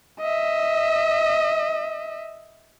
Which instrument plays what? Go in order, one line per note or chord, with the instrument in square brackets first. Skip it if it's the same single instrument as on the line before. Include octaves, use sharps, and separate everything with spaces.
[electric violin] D#5 E5